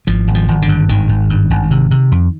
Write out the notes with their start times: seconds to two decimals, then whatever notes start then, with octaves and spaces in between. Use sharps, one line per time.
0.07 G#1 F3
0.28 G#1
0.35 F3
0.48 G#1
0.62 D3
0.69 G2
0.89 G#1 D#3
1.09 G#1
1.30 G2
1.50 G#1
1.71 C3
1.91 C3
2.12 F2